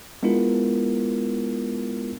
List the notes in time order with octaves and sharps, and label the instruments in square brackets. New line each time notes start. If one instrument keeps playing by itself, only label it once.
[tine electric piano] G#3 B3 D4 E4 F4 A#4